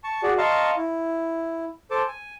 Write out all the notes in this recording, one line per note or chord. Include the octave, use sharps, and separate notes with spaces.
A5 C#6
F#4 G#4 D5
D#5 F5 A5 A#5 C6 C#6
E4
A4 C5 A5 D6
G#5